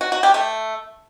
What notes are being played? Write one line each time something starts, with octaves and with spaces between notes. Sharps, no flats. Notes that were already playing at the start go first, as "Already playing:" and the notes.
F#4
F#4
G4
A3